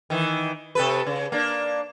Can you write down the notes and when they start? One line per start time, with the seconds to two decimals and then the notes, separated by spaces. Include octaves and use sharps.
0.10 D#3 E3
0.75 C3 A4 B4
1.07 C#3
1.32 A#3 D4